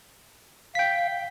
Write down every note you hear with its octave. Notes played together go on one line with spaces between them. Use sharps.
F5 G5 B6